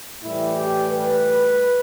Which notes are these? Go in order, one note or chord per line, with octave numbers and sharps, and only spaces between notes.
A2 E3 G3 E4
G4
B4